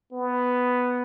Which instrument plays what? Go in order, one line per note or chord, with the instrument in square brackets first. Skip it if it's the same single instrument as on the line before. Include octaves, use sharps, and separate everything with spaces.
[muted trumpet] B3